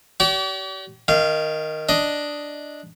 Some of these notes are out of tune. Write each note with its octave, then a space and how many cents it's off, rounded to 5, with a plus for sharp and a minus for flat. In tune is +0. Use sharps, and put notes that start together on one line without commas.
G4 -40 D5 -45
D#3 +0 F5 -25
D4 +0 D#5 +5